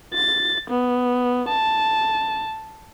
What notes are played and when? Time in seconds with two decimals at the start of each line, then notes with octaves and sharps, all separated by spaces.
0.13 A6
0.70 B3
1.49 A5